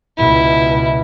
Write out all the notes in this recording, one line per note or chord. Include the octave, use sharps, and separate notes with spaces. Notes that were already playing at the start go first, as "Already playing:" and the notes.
C#2 B2 E4